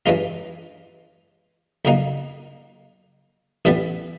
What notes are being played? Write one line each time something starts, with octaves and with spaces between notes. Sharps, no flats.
G2 E3 G#3 C#4 F4
F2 C#3 F#3 A#3 D#4
A1 A2 E3 G3 B3